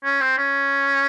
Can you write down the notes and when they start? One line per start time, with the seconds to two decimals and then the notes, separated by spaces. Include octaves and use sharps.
0.04 C#4
0.21 C4
0.38 C#4